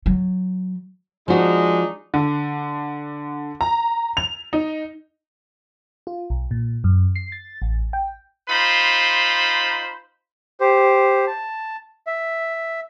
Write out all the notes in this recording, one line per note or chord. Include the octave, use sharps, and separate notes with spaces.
F#3
F3 G#3 D4 D#4 F#4
D3
A#5
F7
D#4
F4
B1
A#2
F#2
C7
A6
A1
G5
D#4 F4 C5 B5
G4 C5
A5
E5